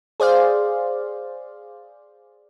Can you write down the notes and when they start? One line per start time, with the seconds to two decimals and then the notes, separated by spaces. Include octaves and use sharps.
0.20 G#4 C5 D5 F5